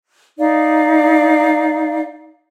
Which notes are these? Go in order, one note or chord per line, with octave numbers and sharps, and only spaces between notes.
D#4 D5 F5